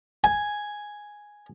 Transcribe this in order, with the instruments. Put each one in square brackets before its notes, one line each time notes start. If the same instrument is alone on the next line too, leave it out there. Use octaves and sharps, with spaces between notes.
[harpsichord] G#5